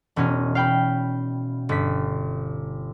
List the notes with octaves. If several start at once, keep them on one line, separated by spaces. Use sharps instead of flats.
E1 B2 C#4 D#4 A#4
F5 G5 B5
G1 B6